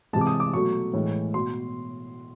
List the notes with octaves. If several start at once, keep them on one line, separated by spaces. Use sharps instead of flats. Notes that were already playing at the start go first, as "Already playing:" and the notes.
C3 E3 G#3 A5
D6
D#6
D6
B2 F#3 A3 C#6
A2 E3 G#3
B2 C6